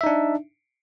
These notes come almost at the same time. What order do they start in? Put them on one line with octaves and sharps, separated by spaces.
E5 D#4 D4